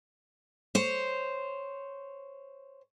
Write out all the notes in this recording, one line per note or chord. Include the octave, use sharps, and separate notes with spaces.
C5 C#5